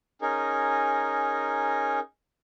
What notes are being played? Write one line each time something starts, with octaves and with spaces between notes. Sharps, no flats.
C#4 D#4 G#4 A#4